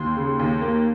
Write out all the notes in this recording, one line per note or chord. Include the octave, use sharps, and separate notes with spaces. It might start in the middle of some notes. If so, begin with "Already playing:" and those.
Already playing: D#2 C6
C#3
D#2
A#3